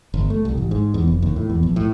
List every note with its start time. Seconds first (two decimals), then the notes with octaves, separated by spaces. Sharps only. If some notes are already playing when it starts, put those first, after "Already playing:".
0.14 G1
0.30 A3
0.45 C2
0.57 A1
0.71 G#2
0.94 E2
1.08 F1
1.22 D#2
1.36 A2
1.50 E2
1.63 A#1
1.76 A2